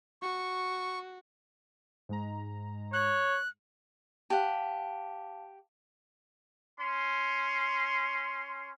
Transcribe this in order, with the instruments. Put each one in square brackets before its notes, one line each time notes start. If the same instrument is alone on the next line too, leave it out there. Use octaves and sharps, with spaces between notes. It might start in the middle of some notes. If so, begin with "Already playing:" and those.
[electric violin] F#4 [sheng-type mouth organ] C#6
[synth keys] G#2 G#3 A#5
[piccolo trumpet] C#5 [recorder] F#6
[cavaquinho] G4 F#5 [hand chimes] F5 A5
[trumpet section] C#4 C6